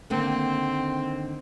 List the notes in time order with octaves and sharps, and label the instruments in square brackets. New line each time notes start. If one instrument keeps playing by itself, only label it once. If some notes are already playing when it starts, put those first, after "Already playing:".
[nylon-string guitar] D3 D#3 A#3 [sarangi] C4